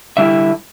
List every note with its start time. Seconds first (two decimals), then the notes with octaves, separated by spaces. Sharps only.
0.17 D3 G3 C4 E4 E5